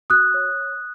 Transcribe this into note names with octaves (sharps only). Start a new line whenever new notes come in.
F#4 D#6 F#6
C#5